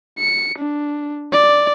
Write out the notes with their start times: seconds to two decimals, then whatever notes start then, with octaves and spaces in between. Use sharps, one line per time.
0.19 C#7
0.59 D4
1.33 D5